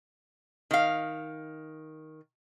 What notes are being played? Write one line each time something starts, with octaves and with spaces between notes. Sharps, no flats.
D#3 F5